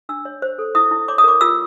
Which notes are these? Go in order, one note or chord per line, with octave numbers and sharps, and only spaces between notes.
D4 E6
C#5
C5
A4
E4 D#6
E4
C#5 D6
D#6
A#4 D6
F4 E6